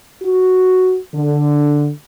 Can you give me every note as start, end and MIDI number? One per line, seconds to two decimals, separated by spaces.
0.22 0.96 66
1.15 1.89 50